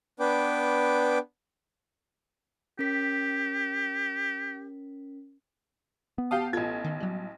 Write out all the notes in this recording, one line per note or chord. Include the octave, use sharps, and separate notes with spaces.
B3 D4 B4 G5 D6
C#4 G4 A#4 B6
B3
G4 F5 A5 D#6 G6
A1 F4 A4 G#6
D#3
F#3 G3